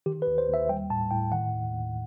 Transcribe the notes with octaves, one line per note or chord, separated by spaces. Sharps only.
D#3 G4
B4
D#2
C5
D#2
E5
G3 G5
A2 A5
A2 G5
D#3 F#5
D#2
D#2